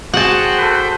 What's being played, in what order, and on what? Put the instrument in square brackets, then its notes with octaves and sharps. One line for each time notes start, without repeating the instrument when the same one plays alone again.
[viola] F#4 G#4 [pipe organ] C5 G5 [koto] F#5 A5
[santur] A4 B4